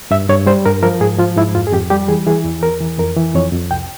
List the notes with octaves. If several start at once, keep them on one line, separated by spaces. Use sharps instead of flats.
G2 E5
G2 C#5
G3 C5
G2 A#4
F3 A#4
G#2 G#4
F3 F4
G#2 E4
F2 F4
G#4
F2 G4
G3 G4
E3 G#4
E3 G#4
E2
E2 A#4
E3
F2 A#4
E3
F2 C#5
F2
C2 G5